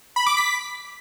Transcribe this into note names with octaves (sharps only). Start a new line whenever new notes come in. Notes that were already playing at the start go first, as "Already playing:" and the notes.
B5
D6
B6